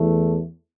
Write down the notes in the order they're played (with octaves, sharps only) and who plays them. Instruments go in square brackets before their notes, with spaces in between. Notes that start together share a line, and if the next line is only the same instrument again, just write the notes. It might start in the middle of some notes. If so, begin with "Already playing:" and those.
Already playing: [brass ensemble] E2 E3 A3